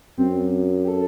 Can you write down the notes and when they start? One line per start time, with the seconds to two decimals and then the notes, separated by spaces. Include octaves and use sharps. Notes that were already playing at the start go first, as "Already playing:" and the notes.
0.18 F#2 C4
0.84 G4
0.88 A4